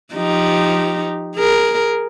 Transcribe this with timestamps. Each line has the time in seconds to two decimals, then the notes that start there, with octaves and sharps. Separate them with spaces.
0.14 F3 D#4 G4
1.36 G#4 A#4